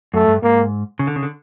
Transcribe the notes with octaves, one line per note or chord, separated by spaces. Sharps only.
F#2 A3
G2
G#2 A#3
C#3
D3
C#3
D3